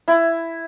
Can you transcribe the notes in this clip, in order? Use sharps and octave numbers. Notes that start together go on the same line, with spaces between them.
E4